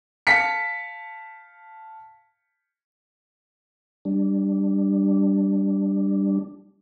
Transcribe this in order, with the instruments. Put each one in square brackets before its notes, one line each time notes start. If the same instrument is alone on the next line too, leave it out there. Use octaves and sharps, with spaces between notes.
[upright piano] F5 A5 B6 C#7
[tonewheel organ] G3 D4